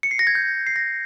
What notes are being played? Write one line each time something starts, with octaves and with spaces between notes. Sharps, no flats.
C#7
C7
A#6
G#6
G6
C7
A#6